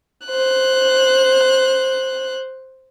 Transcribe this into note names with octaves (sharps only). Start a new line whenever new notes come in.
C5 F#6